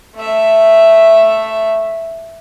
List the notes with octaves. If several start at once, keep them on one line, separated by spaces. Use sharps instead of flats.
A3 E5